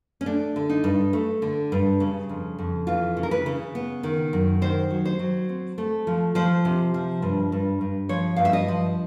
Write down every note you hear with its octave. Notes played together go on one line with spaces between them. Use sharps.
C#4
A3 D4
D3
D#4
G2
A3
D3
G2
C#3
F2
F2
E3 F4
C#3
A#4
B4
C#3
B3
D#3
F#2
D#3 C5
F#3
C5
F#3
C4
A3
F3
F3 C5
C3
F3
G2
G2
G2
F3 C#5
G2 F5
E5
D#5
F3